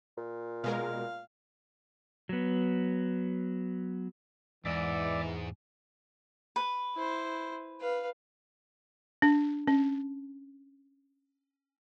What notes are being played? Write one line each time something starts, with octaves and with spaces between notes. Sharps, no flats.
A#2
B2 G#3 A#4 F5
F#3 B3
E2 G#2 E3 D5 E5 D6
B4
E4 C5
B4 F5
D4
C#4